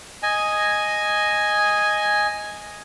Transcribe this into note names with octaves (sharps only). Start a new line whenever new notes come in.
D#5 G#5